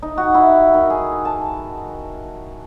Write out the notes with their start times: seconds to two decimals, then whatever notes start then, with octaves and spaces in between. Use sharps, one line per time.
0.02 D#4
0.18 F#4
0.34 E4
0.74 D#3
0.90 G#4
1.25 A5